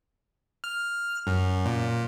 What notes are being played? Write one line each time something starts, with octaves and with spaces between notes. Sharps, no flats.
F6
F#2
A#2